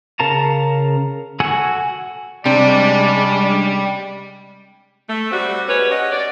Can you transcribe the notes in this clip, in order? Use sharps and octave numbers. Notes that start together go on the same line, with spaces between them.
C#3 A#4 F5 A5 A#5
F#4 A4 F#5 G#5 E6
C3 G3 G#3 C#4 D4 D5
A3
G3 C4 F#4
G#2 C#4 B4 C#5
C#4 G4 D#5 F#5
D5